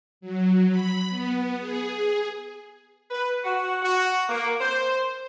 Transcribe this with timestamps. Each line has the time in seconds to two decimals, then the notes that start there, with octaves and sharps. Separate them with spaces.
0.21 F#3
0.69 B5
1.08 B3
1.59 G#4
3.11 B4
3.44 F#4
3.82 F#4
4.29 A#3
4.61 C5